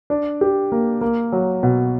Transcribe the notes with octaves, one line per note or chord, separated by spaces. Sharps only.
D4
G4
A#3
A#3
F#3
B2